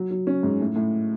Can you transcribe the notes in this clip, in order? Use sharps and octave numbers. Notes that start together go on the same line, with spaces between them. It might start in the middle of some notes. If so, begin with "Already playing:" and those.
Already playing: F#3
F#3
C#4
G#2
A2
A2